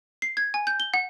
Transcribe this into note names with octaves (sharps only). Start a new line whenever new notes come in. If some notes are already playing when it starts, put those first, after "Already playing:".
C7
G#6
G#5
G6
G7
F#5